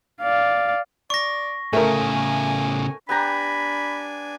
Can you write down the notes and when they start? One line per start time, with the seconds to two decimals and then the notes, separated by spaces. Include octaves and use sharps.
0.22 D5 F5
1.10 D5 C#6 A#6
1.73 A2 C#3 A3 A#4 G#5
3.09 B3 D4 G4 G#5 A#5 B5